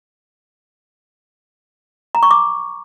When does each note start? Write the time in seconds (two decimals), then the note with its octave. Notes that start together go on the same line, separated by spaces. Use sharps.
2.15 A#5
2.23 C#6
2.31 D6